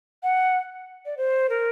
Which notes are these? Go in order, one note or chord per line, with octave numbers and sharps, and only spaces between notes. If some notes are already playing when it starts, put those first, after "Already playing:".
F#5
D5
C5
A#4